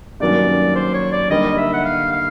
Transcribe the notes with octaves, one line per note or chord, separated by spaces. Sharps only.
G2 D#3 F#3 A#3 C#4 D5
C5
C#5
D5
D3 G3 A#3 D#4 D#5
E5
F#5
F5
F5